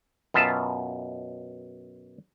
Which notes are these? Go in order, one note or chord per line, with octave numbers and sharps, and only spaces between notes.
F#2 B2 F4 E5 A5